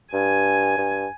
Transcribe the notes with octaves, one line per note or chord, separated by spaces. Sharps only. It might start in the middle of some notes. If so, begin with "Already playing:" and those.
G2 G#5
G2